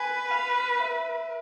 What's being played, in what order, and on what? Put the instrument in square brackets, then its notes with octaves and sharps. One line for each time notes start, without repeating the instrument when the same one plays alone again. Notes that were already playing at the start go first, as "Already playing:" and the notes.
Already playing: [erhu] B4 [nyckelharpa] G#5
[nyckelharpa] F5
E5